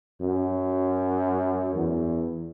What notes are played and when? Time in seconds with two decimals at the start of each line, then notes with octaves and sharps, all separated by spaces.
0.21 F#2
1.74 E2